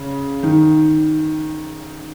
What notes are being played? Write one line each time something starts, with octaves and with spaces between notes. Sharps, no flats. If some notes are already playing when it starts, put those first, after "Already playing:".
Already playing: C#3
D#3